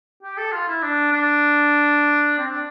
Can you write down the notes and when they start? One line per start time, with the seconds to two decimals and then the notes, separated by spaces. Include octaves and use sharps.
0.23 G4
0.38 A4
0.52 F4
0.68 E4
0.82 D4
1.12 D4
2.38 C4
2.50 D4